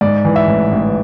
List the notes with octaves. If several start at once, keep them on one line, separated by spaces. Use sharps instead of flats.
G#2 D5
E3
E5
A1
A1